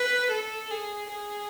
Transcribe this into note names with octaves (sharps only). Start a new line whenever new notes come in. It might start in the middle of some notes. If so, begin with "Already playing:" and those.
Already playing: B4
A4
G#4
G#4